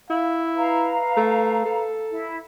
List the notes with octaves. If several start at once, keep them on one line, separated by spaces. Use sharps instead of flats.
E4 F5
B4 F5 A#5
A3
A4
E4